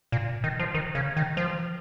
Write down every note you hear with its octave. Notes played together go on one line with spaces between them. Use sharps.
A#2
D#3
F3
D#3
C#3
D#3
F3